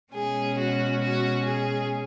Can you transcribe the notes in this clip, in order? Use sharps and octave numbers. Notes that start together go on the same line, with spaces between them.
B2 G#3 C#4 G#4
F#4
F#4
G#4